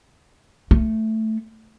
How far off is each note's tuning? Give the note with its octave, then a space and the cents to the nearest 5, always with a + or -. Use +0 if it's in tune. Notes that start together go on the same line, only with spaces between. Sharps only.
A3 +5